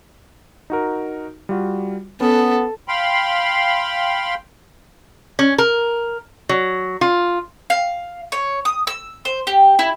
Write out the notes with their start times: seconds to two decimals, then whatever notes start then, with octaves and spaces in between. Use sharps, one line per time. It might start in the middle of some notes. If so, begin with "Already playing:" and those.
0.70 D#4 F#4 A#4
1.49 G3 F4 F#4
2.21 B3 C#4 A4
2.88 F5 G5 B5 C6
5.39 C#4
5.58 A#4
6.49 F#3
7.01 F4
7.70 F5
8.32 C#5
8.65 D#6
8.87 E6
9.25 C5
9.47 G4
9.79 E4